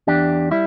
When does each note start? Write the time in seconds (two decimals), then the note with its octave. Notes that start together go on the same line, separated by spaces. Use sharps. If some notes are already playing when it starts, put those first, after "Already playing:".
0.07 E2 D4 G4
0.51 G3 E4